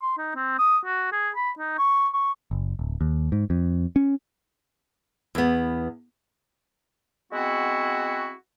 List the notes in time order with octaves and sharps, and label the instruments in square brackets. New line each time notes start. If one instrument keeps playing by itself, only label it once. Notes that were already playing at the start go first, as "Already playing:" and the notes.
[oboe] C6
D#4
C4
D#6
F#4
G#4
B5
D#4
C#6
C#6
[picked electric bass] F#1
D1
D#2
G#2
F2
C#4
[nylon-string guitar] E2 B3
[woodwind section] G#3 B3 C4 E4 F#4